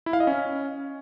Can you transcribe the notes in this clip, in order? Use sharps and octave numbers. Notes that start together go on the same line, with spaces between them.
E4
F5
D#5
C#4